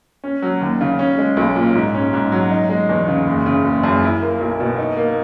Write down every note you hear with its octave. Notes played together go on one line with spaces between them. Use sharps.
C#4
F#3
D#2
C#3
C#4
G#3
B1
A#2
G#2
C#4
G#2
F#3
D#4
G#3
E2
C#3
F#1
C#3
F#1
F#2
E4
A#3
B1
B2
D#4
A#3